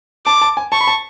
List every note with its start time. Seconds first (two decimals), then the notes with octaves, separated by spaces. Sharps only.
0.26 A5 D6
0.41 A5
0.57 G#5
0.72 A5 C#6
0.81 B5
0.87 A5